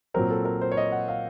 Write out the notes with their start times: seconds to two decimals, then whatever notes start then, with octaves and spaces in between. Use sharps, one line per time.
0.14 A#2 F#3 C4 A#4
0.30 A4
0.45 A#4
0.61 C5
0.72 C#5
0.77 D#5
0.92 F#5
1.08 F5